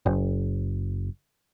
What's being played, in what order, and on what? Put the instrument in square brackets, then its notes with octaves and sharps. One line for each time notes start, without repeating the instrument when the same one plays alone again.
[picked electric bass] F#1